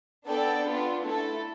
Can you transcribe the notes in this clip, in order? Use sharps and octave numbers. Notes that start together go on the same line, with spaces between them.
B3 D4 A4 D5 G5
B3 D4 F4
A3 E4 A4